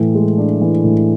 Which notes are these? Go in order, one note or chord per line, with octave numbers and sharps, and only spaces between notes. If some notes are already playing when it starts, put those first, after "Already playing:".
Already playing: A2 E3
G#3
D4
E3
A2